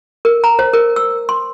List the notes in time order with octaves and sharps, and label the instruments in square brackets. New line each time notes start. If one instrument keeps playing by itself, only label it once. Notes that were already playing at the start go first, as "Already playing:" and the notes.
[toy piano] A#4
A#5
C5
A#4
E6
C6